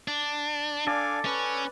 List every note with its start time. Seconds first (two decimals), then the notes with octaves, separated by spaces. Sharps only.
0.08 D4
0.87 D4 A4 D5 F5 G#5
1.25 C#4 B4